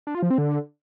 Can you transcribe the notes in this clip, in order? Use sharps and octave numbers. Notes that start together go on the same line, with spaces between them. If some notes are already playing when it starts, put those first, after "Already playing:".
D4
F4
F3
C4
D3